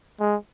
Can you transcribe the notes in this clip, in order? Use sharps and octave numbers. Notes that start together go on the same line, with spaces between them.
G#3